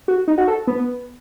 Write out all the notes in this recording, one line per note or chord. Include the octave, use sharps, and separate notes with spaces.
F#4
D#4
F#4
A4
B3